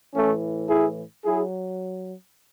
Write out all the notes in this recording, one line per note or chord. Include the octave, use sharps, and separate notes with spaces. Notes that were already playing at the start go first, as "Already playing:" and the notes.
A2 E3 A3 C#4
E4 G#4
F#3 E4 G#4